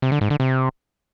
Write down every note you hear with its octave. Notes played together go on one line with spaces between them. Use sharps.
C3
D3
G#2
D3
C3